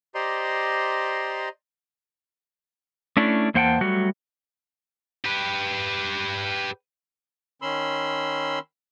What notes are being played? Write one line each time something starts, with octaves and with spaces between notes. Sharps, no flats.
G4 C5 D5 D#5 A#5 C6
A3 C#4 D4 E4
E2 A#3 C5 F#5 G5 A5
F#3 G3 A3 F#4
G4 B4
D#3 C#4 B5 C6 E6